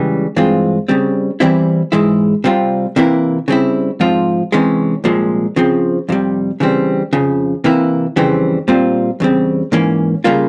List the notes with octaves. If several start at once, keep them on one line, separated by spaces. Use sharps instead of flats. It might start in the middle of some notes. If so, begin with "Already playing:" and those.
Already playing: C#2 C#3 E3 G3
G2 E3 G#3 C4 F4
C#3 G3 C4
E2 E3 G3 C4 E4
G#2 E3 G#3 E4
C3 G3 C4 F4
C3 E3 A#3 E4
C#3 G3 C4 E4
G#2 F3 C4 F4
C3 E3 G#3 C#4
C2 A#2 F3 G#3
C#3 F3 C4
F2 C3 G3
C#3 E3 G3 C4
F2 C#3 F3
C3 E3 A#3 E4
F2 C#3 E3 G3 C4
A#2 G3 C4 F4
E2 C#3 G3 C4
G#2 E3 A#3 C#4
C#3 G3 A#3 F4